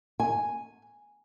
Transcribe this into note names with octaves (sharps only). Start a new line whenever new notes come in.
G#5